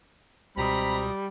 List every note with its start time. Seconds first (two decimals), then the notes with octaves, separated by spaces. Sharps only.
0.57 C#2 B2 G3 C4 A#5 B5 D#6